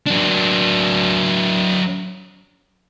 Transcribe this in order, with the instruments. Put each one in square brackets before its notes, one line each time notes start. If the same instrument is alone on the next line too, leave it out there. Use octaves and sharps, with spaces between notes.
[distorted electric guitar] F#3 D4